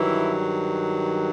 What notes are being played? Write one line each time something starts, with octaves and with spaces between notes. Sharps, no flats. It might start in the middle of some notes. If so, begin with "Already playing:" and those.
Already playing: G2 D#3 E3 F#3 E4